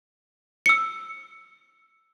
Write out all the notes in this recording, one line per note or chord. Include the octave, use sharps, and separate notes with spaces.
E6 C#7